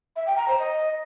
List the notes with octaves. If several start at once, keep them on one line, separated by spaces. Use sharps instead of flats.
E5
G5
A#5
C5
D#5